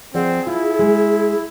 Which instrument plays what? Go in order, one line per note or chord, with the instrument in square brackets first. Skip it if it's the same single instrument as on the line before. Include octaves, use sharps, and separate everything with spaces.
[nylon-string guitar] F3 D5 F#5 [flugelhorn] C4 [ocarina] G#4
[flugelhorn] E4 [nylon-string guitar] F4
[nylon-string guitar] G#3